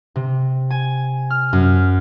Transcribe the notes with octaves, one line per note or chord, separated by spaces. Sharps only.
C3
G#5
F6
F#2